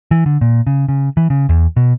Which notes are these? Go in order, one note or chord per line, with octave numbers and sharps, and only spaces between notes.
E3
D3
A#2
C#3
C#3
E3
C#3
E2
B2